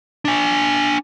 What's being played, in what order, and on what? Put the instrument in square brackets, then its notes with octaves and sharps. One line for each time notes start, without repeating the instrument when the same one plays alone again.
[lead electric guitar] D4 G#5